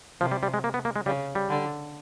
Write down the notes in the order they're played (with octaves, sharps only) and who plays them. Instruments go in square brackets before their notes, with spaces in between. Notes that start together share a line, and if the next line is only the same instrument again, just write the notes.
[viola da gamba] C3 [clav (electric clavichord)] F3
[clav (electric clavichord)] G3
G3
G#3
A#3
B3
A#3
G#3
[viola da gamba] C#3 [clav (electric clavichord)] G3
[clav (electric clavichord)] G3
[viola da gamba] D3